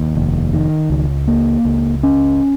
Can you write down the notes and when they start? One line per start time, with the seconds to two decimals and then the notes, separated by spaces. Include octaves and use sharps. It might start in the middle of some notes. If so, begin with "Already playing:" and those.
Already playing: D#2
0.15 F1
0.53 D#3
0.90 C#2
1.27 A#3
1.65 C#2
2.03 C#4